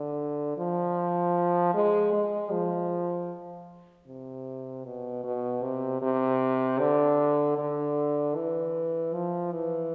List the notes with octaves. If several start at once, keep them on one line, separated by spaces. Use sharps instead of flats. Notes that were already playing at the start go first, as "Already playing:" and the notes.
Already playing: D3
F3
G#3
G#3
F3
C3
B2
B2
C3
C3
D3
D3
E3
F3
E3